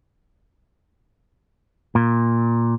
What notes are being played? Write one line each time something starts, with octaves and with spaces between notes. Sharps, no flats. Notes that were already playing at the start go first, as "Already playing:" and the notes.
A#2